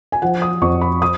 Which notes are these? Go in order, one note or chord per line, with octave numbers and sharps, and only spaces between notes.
G#5
F3 F#5
D#6
F2 C#6
B5
D#6